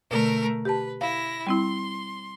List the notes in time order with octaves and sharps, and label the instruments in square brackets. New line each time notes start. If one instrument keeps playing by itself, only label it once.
[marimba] B2 D3 [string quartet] A3 A#4
[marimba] G4 A5 [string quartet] B4
[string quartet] E4 A#6 [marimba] F5
[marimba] G3 C4 E4 [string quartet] C6